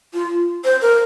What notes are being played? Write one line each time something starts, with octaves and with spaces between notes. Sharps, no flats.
F4
C5
A#4